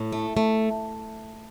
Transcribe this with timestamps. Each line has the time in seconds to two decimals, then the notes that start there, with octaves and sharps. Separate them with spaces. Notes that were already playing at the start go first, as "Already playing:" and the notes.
Already playing: A2
0.12 A3
0.37 A3